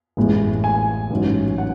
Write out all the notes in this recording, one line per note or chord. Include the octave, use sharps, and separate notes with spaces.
A1 A2 G#3
G#5
A1 G#2 F#3 C#4
F#5